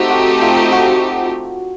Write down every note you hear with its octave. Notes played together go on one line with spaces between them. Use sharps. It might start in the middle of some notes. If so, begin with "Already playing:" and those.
Already playing: A3 C4 D#4 F#4 G4
F#4
F4
F#4